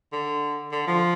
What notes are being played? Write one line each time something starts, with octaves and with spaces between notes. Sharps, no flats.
D3
D3
F3